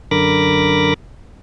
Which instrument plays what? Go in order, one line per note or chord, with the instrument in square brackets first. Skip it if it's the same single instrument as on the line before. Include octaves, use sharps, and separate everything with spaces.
[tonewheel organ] F#2 D3 A#4 B5 D6 A#6